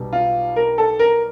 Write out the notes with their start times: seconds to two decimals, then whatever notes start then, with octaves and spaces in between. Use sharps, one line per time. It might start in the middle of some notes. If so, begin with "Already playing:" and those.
Already playing: B1 B2 G3
0.13 F4
0.56 A#4
0.78 A4
0.99 A#4